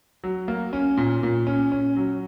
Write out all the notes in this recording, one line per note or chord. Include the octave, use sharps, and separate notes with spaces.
F#3
A#3
C#4
A#2
A#2
C#4
C#4
F#3